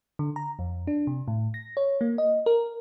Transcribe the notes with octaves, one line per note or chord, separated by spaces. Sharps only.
D3
A#5
F2
D4
C3
A2
A#6
C#5
A#3
D#5
A#4